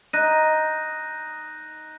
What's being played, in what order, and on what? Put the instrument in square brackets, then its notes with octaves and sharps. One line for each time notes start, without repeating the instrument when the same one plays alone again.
[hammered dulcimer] D#4 [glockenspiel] F#6 A#6 D#7